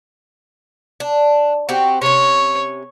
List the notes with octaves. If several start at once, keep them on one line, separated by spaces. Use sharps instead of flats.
D4
C4 F#4 G4
C3 C#4 C#5